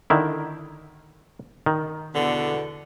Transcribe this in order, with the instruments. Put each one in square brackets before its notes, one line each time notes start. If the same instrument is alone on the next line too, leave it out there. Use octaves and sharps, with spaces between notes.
[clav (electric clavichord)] D3 D#3 E4
D#3
[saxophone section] E2 B2 D3